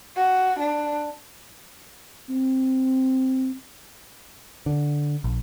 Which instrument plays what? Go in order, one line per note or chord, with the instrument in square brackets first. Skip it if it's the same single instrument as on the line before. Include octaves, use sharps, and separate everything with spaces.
[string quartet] F#4
D4
[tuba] C4
[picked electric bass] D3
A#1